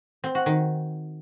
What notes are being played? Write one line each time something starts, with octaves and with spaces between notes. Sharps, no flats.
C4
F#4
D#3